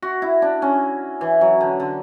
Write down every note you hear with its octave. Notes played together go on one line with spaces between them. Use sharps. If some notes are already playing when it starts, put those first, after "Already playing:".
F#4
E4
D4
C#4
E3
F#3
D3
D3